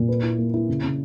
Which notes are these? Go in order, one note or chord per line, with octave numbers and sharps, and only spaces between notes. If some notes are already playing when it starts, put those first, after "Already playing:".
Already playing: A#2
B4
E4
A#3
E4
C#3
C#3